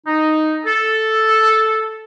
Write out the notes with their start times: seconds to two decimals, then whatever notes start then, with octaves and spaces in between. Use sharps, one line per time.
0.07 D#4
0.66 A4